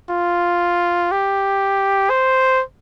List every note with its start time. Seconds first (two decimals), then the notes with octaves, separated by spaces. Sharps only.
0.10 F4
1.12 G4
2.10 C5